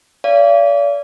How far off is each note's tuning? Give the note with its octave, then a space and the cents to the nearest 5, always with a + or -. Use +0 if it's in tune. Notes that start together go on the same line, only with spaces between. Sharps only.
D5 -40 F5 -35